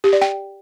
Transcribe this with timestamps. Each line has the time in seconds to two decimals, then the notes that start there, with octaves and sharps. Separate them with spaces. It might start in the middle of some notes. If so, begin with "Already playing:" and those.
0.04 G4
0.13 D5
0.22 G5